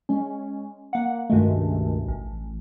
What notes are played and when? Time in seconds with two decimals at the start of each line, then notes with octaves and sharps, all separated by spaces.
0.09 G#3 C#4
0.93 A#3 F#5
1.30 C#2 G2 B2 D#3 G#3 A3
2.08 A1